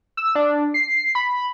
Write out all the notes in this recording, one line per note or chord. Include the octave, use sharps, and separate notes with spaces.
E6
D4
C7
B5